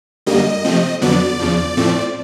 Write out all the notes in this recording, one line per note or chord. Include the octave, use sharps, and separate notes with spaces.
F#2 D3 G3 A#3 D#5
C3 F3 A3 C4
F2 D3 F#3 B3 D5
E2 C#3 F3
A2 F3 A3 C4